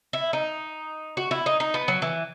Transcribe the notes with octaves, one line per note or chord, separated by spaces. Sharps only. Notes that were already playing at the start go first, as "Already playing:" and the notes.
E4
D#4
F#4
E4
D#4
D#4
B3
F#3
E3